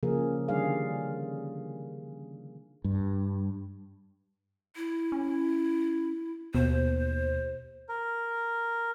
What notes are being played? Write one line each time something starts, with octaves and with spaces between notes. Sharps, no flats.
C#3 F3 A#3 G#4 A#4
D3 D#3 G3 G#4 D5 F5
G2
E4
C#4
D#2 B2 C5
A#4